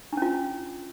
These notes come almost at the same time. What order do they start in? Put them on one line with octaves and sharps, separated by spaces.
D4 C#4 F4